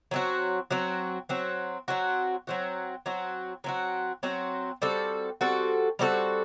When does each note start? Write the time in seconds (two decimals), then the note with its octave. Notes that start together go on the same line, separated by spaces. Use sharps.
0.11 F#3 C4 F#4
0.71 F#3 C4 F#4
1.29 F#3 C4 F#4
1.88 F#3 C4 F#4
2.47 F#3 C4 F#4
3.06 F#3 C4 F#4
3.64 F#3 C4 F#4
4.23 F#3 C4 F#4
4.82 G3 C4 F#4 A4
5.41 G3 C4 F#4 A4
5.99 G3 C4 F#4 A4